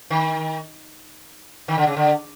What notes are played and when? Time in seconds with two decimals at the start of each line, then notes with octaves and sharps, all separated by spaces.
0.10 D#3
1.68 D#3
1.77 D3
1.87 C#3
1.97 D3